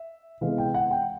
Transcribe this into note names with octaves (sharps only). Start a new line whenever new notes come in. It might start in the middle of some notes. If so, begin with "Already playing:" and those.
Already playing: E5
C3 E3 G#3 B3 F5
G5
F#5
G5